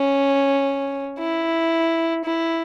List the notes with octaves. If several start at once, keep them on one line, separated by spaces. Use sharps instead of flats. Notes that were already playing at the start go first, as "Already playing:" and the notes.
Already playing: C#4
E4
E4